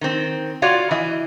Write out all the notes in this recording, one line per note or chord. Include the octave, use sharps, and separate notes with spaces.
D#3 C4
F4 F#4 C#5 D5 F5
E3 D#5